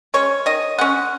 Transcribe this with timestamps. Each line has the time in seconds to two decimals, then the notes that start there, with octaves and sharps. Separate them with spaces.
0.14 G#3 C#4 C#5
0.46 D#3 D#5
0.79 G#3 C#4 F#5